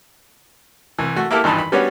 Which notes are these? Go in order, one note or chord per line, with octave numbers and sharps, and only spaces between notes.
C2 E3
A3 F#4
A#3 E4 G4 A4 A#4
G#1 G2 E3 D#4 A5 B5
B5
G3 B3 C#4 D4 F#4 C#5